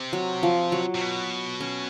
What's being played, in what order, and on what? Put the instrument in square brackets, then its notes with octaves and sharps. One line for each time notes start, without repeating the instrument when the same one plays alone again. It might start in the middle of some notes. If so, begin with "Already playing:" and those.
Already playing: [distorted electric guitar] C3
[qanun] F#3
F3
F#3
[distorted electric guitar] C3
B2
[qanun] C#4